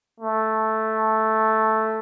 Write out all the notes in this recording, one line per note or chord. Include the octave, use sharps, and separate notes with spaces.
A3